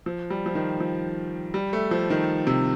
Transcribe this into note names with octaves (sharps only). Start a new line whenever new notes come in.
F3
G3
F3
D#3
F3
G3
A3
F3
D#3
C3